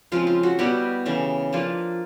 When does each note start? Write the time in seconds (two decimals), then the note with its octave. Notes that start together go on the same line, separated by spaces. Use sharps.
0.12 C#3 F3 G#3 C4 F4
0.27 F4
0.43 F#4
0.59 B2 G3 B3 E4 G4
1.06 C#3 E3 A3
1.53 F3 A#3 D4 F4